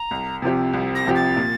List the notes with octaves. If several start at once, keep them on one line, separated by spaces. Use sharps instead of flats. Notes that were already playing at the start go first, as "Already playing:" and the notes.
Already playing: A#5
C2
C3 F3 C4 G4
C2
A#6
C3 F3 C4 G4
A6
A#2